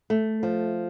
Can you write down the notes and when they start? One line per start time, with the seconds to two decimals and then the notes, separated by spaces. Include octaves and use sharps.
0.10 A3
0.43 F3